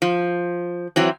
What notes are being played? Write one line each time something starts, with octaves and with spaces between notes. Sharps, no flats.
F3
E3 F#3 C4